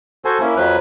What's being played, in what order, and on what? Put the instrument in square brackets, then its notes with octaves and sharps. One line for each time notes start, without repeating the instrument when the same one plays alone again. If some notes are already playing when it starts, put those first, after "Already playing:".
[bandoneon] F#4 A4 C5 G#5
A#3 C#4 E4
F2 F3 F#3 B4